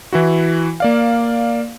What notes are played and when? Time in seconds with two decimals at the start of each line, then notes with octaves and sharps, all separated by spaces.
0.13 E3 E4 F#4
0.80 A#3 D5 F5